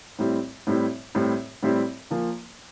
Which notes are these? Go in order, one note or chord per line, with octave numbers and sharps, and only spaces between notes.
A2 G3 C4 E4
A2 G3 C4 E4
A2 G3 C4 E4
A2 G3 C4 E4
A#2 F3 A#3